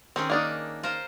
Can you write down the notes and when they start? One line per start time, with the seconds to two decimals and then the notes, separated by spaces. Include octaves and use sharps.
0.16 D#3 C4 C#4 G#4
0.30 A#3 D4 D#4
0.83 F4 A#4 C5